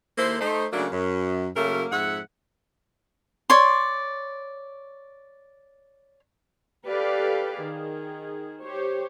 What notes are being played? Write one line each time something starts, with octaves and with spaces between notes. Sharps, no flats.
D#2 A#3 E4 A4 C5
A3 D#4 C5
C#3 F#3 A3 A#3 D4
F#2
F#2 C#3 F#3 A3 A#3 A#4
F2 G#2 E5 F#5
C#5 D5 C6
G4 A4 B4 D5 F5
D#3 G#4
G4 C5 C#5